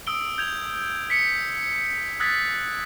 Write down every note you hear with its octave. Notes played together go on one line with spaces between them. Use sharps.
D#6 E6 D7 G7
G6 G#6 F7
B6 C#7
D#6 E6 F#6 G#6 A6 B6